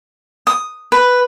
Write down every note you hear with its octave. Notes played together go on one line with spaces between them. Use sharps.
D#6
B4